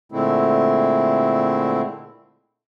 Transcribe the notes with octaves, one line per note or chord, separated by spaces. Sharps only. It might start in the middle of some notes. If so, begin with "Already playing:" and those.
A#2 D3 G#3 A3 C4 E4